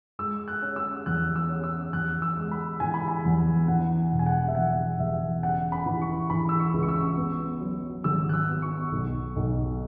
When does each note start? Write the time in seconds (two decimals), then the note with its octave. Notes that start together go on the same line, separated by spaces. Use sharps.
0.19 G#3 E6
0.48 F#6
0.62 C#4
0.76 E6
1.06 E2 F#6
1.36 E6
1.49 C#4
1.64 E6
1.93 E2 F#6
2.22 E6
2.37 G#3
2.51 B5
2.80 E3 G#5
2.94 B5
3.08 G#5
3.25 E2
3.68 E3 F#5
4.12 E1
4.19 G#5
4.26 F#5
4.48 E5
4.55 E2 F#5
4.99 E2 E5
5.43 C#3 F#5
5.72 B5
5.86 E3
6.02 C#6
6.30 E3 B5
6.49 E6
6.60 C#6
6.73 C#2
6.83 C#6
6.88 E6
7.17 B3
7.61 F#3
8.04 G#1 E6
8.29 F#6
8.33 E6
8.49 B3
8.62 C#6
8.92 B1
9.36 B1